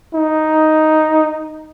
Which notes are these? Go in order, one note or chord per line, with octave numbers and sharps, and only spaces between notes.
D#4